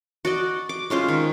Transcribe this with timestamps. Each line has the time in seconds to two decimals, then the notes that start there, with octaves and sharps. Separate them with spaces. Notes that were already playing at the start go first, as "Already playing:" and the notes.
0.25 F#4 D5 D#5
0.69 D6
0.90 G#3 C#4 F4 C5
1.08 D#3